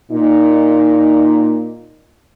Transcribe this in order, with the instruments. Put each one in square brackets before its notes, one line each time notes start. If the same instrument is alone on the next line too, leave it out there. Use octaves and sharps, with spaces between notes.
[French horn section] A#2 D#4